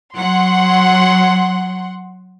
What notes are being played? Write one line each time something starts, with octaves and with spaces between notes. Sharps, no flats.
F#3 F#5 C6